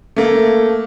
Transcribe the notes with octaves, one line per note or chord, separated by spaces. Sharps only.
A3 A#3